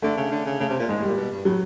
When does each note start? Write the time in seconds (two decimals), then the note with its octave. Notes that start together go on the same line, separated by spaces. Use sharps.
0.02 D3 A3
0.17 C#3
0.31 D3
0.46 C#3
0.60 C#3 A3
0.69 C3
0.79 A#2
0.89 G#2 G#3
0.98 A2
1.02 G3
1.08 A#2
1.17 B2
1.32 G2
1.45 A2 F#3